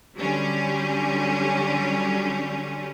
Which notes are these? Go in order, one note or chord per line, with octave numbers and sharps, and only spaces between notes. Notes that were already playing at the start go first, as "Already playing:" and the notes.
D3 F#3 G3 C#4